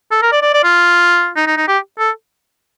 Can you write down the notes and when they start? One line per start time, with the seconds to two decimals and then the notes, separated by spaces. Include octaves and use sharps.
0.11 A4
0.22 A#4
0.32 D5
0.42 D5
0.53 D5
0.64 F4
1.36 D#4
1.47 D#4
1.57 D#4
1.68 G4
1.99 A4